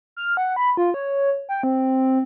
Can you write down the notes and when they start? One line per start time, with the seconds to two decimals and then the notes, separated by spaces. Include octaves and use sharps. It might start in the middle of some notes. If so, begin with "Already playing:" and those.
0.17 F6
0.37 F#5
0.56 B5
0.77 F4
0.94 C#5
1.49 G5
1.63 C4